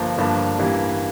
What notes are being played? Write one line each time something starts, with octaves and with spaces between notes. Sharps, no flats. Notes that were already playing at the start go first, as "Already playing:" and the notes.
Already playing: G1 G2 F3 A#3 D4
G1 G2 F3 A#3 D4
A1 G2 E3 G3 A#3